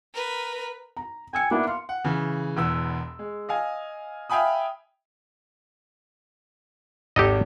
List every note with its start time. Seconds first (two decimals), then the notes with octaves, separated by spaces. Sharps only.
0.14 A#4 B4
0.97 A#5
1.33 G5 G#5 E6 C#7
1.51 A#3 B3 D4 E4
1.67 F5 C6
1.89 F#5
2.04 C#3 E3
2.57 E1 E2 B3 E6
3.19 G#3
3.49 D#5 F5 G#5
4.30 E5 F5 G5 G#5 B5 D#6
7.16 G#1 G4 A4 D#5